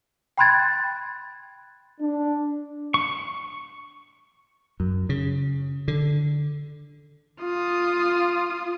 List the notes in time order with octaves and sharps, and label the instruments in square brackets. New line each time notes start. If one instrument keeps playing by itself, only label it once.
[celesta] G5 B5 C6 F#6 G#6 A6
[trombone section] D4
[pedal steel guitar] C#6
[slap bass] F#2
C#3
D3
[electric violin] F4 D#6